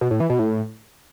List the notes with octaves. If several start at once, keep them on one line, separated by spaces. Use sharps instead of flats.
B2
A2
E3
B2
A2